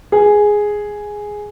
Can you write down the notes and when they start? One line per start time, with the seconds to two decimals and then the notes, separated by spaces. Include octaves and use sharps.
0.12 G#4